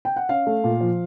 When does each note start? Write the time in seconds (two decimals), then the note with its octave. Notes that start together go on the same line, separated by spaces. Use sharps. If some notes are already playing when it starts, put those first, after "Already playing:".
0.05 G5
0.16 F#5
0.29 C#4 F5
0.47 A3
0.64 A#2
0.81 F3